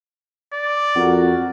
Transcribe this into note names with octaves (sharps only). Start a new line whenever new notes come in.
D5
F2 F#4 A#4 F#5